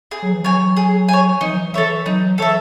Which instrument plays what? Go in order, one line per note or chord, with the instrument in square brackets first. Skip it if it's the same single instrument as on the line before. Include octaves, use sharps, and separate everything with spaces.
[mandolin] G#4
[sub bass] F#3
E3
[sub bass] F#3 [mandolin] C#5 G#5
[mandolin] G#4
C#5 G#5
[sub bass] E3 [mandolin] D#4
[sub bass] F#3
E3
[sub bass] E3 [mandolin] A4 C#5 E5
[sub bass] F#3 [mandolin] D#4
[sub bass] E3 [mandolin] A4 C#5 E5